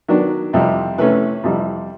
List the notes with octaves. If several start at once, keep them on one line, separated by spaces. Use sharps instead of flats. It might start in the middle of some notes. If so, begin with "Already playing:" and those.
D#3 F#3 B3 D4
F2 C3 E3 G3
C3 E3 A3 C#4 B4
F2 C3 E3 G3